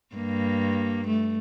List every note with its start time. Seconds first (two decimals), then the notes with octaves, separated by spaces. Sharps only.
0.16 G2 A#3
1.07 A3